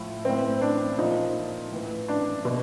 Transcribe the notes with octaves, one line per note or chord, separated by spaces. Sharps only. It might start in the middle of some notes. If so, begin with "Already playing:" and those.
Already playing: A2 F3
A2 E3 C4
D4
A#2 F3 D#4
A2 E3
D4
B2